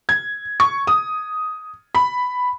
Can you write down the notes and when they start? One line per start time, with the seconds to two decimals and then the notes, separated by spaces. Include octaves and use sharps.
0.09 G#6
0.60 C#6
0.87 D#6
1.95 B5